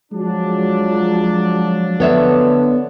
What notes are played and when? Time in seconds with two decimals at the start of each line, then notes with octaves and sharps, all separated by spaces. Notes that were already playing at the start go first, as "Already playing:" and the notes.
0.12 F3 F#3 G#3 D4
2.00 D3 B3 C#5 E5